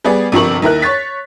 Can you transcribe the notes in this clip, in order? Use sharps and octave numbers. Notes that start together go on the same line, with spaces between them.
G3 B3 G#4 D5
G1 C3 F3 A#4 C#6 F#7
D#2 E4 A#4 F#6
C#5 C#6 A6 B6